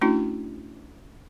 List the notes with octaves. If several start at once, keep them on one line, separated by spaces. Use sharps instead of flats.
A3 C#4 D4 E4 F#4